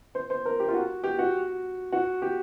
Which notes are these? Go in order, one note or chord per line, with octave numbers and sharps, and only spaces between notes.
C5
C5
A#4
G4
F4
F#4
G4
F#4
F#4
G4